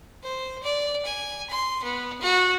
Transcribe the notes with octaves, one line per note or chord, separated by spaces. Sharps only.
C5
D5
G#5
C6
B3
F#4